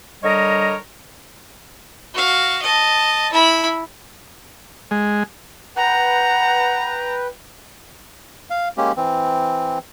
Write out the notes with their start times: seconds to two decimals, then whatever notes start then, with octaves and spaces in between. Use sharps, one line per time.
0.23 D3 G3 A#4 C#5 D#5
2.15 F#4 F5
2.62 D#5 A5
3.33 E4 B5
4.91 G#3
5.77 B4 F#5 G5 A#5
8.50 F5
8.77 G#3 A#3 C#4 G4
8.96 E3 C4